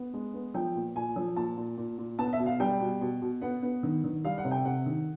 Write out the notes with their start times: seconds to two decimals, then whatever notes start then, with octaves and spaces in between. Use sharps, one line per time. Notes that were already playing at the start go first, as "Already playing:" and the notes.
Already playing: B3
0.14 G#3
0.33 B3
0.54 F3 G5
0.75 A#2
0.96 A#2 G#5
1.16 F3
1.36 A#2 A5
1.57 A#2
1.78 A#2
1.98 A#2
2.18 B3 A5
2.33 E5
2.39 B2
2.46 F5
2.60 G3 G5
2.81 B2
3.01 B2
3.22 B2
3.41 B3 F#5
3.63 B3
3.83 D#3
4.04 D#3
4.24 G3 F5
4.38 F#5
4.45 C3
4.51 G5
4.65 C3 F#5
4.86 D#3